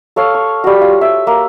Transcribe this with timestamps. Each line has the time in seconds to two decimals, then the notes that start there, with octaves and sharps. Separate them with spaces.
0.16 A4 C#5 F5
0.34 C#6
0.64 G3 F#4
0.81 F4
1.01 E5
1.27 A#3